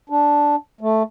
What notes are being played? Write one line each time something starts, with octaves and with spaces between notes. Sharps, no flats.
D4
A3